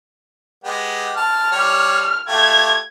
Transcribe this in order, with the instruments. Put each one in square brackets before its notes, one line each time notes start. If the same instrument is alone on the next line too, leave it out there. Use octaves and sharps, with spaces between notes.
[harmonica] G#3 B3 G4
[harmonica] A5 [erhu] F6
[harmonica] G3 C#5
[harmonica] A3 F4 G4 [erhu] G#6